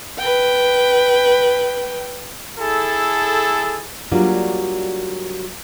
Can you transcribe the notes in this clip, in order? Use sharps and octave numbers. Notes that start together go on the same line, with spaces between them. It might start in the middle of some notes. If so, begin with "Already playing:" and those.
B4 G5
E4 G#4 A4
F#3 G3 A#3 D4 F4 F#4